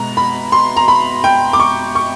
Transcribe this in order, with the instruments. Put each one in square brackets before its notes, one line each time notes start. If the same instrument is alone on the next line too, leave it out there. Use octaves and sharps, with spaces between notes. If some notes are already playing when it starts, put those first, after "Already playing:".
Already playing: [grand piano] B2 G#3 B3 A#5
B5
C6
A#5
B5
G5
D6
C#6
C#6